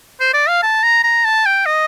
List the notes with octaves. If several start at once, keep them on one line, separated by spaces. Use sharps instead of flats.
C5
D5
F5
A5
A#5
A#5
A5
G5
D#5